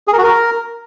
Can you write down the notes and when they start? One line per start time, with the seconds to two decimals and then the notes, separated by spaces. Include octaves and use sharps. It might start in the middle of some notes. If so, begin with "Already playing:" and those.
0.08 G#4
0.13 A#4
0.18 F#4
0.24 A#4